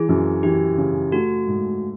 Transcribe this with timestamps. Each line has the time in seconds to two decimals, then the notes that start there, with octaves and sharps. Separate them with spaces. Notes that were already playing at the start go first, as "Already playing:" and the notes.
Already playing: E3 G#4
0.09 F#2
0.43 E3 G4
0.78 C#3
1.12 A3 F#4
1.48 G#2